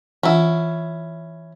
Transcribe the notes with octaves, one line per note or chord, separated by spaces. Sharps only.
E3 C#4 E4 F4 F#5